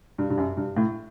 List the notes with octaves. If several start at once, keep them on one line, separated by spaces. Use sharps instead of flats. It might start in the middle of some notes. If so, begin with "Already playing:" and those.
G2
G2
F#2
G2
A2